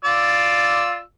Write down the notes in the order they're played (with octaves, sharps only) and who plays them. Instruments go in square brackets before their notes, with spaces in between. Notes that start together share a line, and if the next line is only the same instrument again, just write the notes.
[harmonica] F4 D5 E6